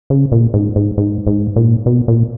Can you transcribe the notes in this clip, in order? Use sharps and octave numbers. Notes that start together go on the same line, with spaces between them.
C#3
A#2
G#2
G#2
G#2
G#2
A#2
B2
A#2